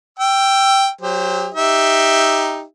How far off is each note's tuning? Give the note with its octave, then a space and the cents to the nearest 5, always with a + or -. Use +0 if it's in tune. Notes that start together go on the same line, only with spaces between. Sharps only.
G5 +0 E6 +25
F#3 +0 G4 +35 C5 +0
D#4 +0 G4 +5 E5 +0